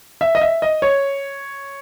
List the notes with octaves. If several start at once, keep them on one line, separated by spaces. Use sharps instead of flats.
E5
D#5
E5
D#5
C#5